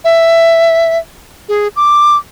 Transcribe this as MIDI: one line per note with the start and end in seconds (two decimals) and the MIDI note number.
0.05 0.98 76
1.49 1.68 68
1.76 2.16 86